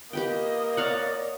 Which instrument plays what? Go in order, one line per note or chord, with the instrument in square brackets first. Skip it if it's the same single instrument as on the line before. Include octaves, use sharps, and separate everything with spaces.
[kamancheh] A#3 D#5 [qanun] G4 B4 G5
[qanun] C#5 F5 F#5 [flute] D5